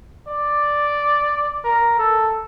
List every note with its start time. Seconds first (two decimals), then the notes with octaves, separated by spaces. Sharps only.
0.28 D5
1.65 A#4
1.99 A4